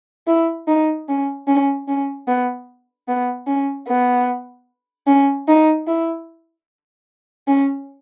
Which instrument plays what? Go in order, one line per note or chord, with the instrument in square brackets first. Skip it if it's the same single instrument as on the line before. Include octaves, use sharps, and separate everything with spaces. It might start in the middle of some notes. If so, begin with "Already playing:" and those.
[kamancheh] E4
D#4
C#4
C#4
C#4
B3
B3
C#4
B3
C#4
D#4
E4
C#4